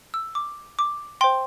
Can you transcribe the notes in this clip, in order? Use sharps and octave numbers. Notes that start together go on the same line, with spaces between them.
E6
D6
D6
C5 G5 C6